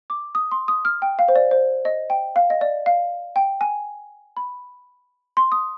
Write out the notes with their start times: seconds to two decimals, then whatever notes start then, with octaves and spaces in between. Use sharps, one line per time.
0.10 D6
0.35 D#6
0.51 C6
0.68 D#6
0.85 F6
1.02 G5
1.19 F5
1.28 C5
1.36 D5
1.51 C5
1.85 D#5
2.10 G5
2.36 F5
2.50 D#5
2.61 D5
2.86 F5
3.36 G5
3.61 G#5
4.37 B5
5.37 C6
5.52 D#6